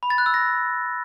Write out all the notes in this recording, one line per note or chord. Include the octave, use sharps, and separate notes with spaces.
B5
A6
F#6
E6
A#6